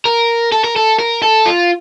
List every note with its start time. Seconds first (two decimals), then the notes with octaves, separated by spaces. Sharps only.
0.05 A#4
0.52 A4
0.64 A#4
0.76 A4
0.99 A#4
1.23 A4
1.46 F4